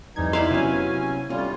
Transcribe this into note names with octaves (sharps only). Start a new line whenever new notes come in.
F2 E3 G3 D#4 G#6
E4 D5 F5 C6
C3 F#3 B3 C#4 G#5
A2 G3 C#4 F4